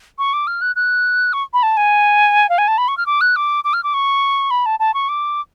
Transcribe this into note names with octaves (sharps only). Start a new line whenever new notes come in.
C#6
D6
F6
F#6
F#6
C#6
B5
A5
G#5
F5
G#5
A5
B5
C#6
F6
D6
F#6
D6
D6
F6
D6
C#6
B5
A5
A5
C#6
D6